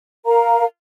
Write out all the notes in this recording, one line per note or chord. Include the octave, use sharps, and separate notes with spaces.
A#4 F5 A#5